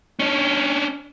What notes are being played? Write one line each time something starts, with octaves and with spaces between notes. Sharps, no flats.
C#4 D4